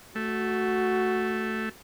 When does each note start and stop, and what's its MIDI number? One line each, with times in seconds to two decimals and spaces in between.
0.15 1.69 57
0.15 1.69 66